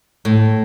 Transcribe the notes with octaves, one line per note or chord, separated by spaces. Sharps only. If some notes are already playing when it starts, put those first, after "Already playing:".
A2